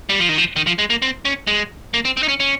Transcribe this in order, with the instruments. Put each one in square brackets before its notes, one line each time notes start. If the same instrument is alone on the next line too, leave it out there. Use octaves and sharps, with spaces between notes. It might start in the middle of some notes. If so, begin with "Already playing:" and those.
[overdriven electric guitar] G3
F3
D#3
F3
D#3
F3
G#3
A#3
C4
C#4
G#3
A#3
C4
C4
D#4
C#4
C#4